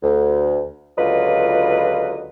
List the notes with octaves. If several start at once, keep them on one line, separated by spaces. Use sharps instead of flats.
D2
C#2 D3 F#3 F4 B4 D#5